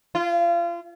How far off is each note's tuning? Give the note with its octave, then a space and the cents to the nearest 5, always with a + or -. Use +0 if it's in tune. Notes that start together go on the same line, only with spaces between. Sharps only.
F4 -30